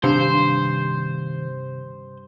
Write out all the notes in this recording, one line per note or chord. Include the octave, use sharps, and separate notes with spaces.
G2 C3 D#3 C5 F5 G#5